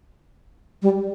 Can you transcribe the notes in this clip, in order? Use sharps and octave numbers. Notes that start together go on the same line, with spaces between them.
G3